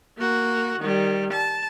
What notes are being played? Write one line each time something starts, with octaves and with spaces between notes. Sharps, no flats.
A#3 F#4
D#3 G3
A5